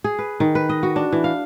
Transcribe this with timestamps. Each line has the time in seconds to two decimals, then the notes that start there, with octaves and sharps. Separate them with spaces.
0.04 G#4
0.19 B4
0.40 D#3
0.55 B4
0.69 D#5
0.83 F#4
0.96 D4
1.13 E3
1.24 F5